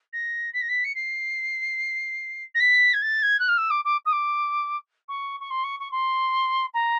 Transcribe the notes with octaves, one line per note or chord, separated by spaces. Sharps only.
A#6
B6
A#6
B6
C#7
C7
A#6
B6
G#6
A6
G#6
F#6
F6
E6
D6
D6
D#6
D6
C#6
C#6
C6
C#6
C#6
C6
A#5